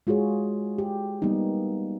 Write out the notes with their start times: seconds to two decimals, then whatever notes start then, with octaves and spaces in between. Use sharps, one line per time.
0.07 G#3 F4 F#4 G#4 C#5
0.78 G4
1.22 G3 A#3 B3 D#4